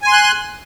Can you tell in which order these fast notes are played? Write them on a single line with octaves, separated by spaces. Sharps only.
G#5 C6 F#6